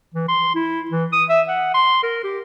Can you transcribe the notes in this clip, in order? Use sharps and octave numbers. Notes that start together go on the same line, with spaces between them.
E3
C6
E4
E3
D#6
E5
F#5
C6
A#4
G4